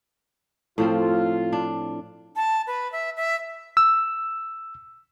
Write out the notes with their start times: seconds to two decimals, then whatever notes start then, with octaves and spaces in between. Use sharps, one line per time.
0.78 A2 F3 C4 F4
1.52 D4
2.36 A5
2.67 B4
2.92 E5
3.17 E5
3.77 E6